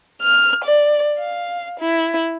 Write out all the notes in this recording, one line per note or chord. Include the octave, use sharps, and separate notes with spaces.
F6
D5
F5
E4